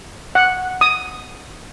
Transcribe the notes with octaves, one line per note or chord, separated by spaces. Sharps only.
F#5
D#6